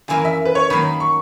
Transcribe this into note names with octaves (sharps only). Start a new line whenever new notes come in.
F#2 E3 A#3 E4 A#4 G#5
E5
B4
C#5
D#3 F#3 A#3 B5
C#6